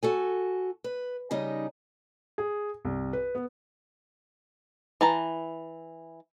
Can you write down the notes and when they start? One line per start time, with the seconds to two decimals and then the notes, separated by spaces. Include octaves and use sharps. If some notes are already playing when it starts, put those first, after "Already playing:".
0.03 F#4 A4 G#5
0.84 B4
1.31 C#3 G3 D#4 D#5
2.38 G#4
2.85 C2
3.13 B4
3.35 B3
5.01 E3 A5 A#5